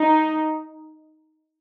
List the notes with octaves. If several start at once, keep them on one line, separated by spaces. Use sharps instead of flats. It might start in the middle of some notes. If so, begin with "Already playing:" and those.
Already playing: D#4